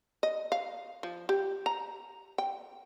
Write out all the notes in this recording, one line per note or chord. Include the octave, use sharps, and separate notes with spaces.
D#5
F5
F3
G4
A#5
G5